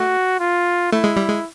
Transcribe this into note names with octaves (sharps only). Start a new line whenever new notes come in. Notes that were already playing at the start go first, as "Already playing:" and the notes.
Already playing: A3 F#4
F4
A3 E4
G#3
G3
G#3